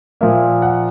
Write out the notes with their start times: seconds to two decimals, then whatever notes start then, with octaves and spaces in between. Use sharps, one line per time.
0.21 A#2 F3 A#3 E5
0.62 F#5